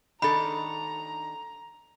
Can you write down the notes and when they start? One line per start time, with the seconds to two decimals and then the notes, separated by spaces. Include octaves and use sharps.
0.22 D#3 D4 A4 A#5 B5